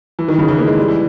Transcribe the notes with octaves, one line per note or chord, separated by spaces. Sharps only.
E3
D#3
C#3
E3
A#3
G#3
G3
E3